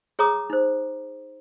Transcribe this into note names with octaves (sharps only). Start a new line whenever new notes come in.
G#4 C#5 A#5 D6 D#6
D#4 C5